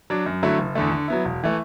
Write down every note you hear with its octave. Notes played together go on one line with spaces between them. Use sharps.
F#3 D4
F#2
D3 F#3 A3 E4
F#1
E2 D3 A3
D3
F#3 B3 E4
E1
E3 A3